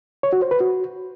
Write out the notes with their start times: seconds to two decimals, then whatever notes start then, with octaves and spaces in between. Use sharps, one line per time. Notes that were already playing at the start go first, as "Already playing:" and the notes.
0.23 C#5
0.33 F#4
0.42 C5
0.51 B4
0.60 F#4